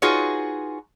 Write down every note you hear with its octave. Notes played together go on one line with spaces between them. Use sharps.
D#4 F4 F#4 G#4 B4 C#5